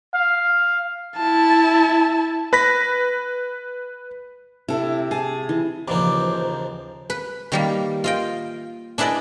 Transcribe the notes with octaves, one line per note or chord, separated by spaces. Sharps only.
F5
E4 A5
B4 B5 A#6 B6
C3 E4 A4
G#4 A5
E3
D#2 C#3 E3 F3 A#3 C5 D5
B4
D#3 G3 A#3
F4 D#5 G5
D4 E4 G#4 B4 D5 D#5